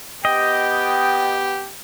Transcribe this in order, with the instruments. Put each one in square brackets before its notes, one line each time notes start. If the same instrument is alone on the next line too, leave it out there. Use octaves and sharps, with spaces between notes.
[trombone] B3 [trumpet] G4 [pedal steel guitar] D#5 [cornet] G5